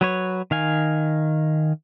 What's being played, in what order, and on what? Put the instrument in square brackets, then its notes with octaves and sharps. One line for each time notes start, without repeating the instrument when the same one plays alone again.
[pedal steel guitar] F#3 B4 C#5
D#3 F5 G#5